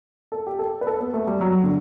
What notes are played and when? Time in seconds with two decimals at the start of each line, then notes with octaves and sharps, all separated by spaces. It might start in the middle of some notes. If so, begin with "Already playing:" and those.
0.32 A4
0.47 G4
0.59 A4
0.81 B4
0.87 A4
1.00 B3
1.14 A3
1.27 G3
1.41 F#3
1.64 D3